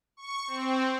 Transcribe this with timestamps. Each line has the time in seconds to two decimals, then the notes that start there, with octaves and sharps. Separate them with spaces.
0.17 C#6
0.47 C4